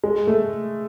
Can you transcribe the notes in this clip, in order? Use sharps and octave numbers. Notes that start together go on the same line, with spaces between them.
G#3
A3